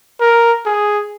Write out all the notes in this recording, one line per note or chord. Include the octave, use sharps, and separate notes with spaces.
A#4
G#4